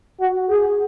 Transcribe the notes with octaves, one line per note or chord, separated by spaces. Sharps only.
F#4
G#4